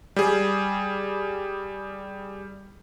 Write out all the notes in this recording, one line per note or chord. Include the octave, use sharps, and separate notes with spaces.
G3 G#4